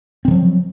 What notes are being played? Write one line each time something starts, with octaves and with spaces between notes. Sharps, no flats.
D#3 F3 F#3 C4